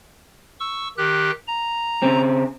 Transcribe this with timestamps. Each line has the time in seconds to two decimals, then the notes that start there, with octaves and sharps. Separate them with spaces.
0.60 C#6 E6
0.98 D#3 G4 F#6
1.48 A#5
2.02 C#3 C4